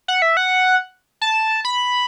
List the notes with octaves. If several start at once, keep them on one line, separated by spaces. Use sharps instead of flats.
F#5
E5
F#5
A5
B5